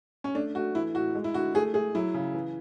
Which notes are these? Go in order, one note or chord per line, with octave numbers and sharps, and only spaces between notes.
C#4
A3 D4
A3 F#4
E3 E4
A2 F#4
G#3
E4
D3 F#4
A3 G#4
A3 G#4
F#3 E4
C#3
E3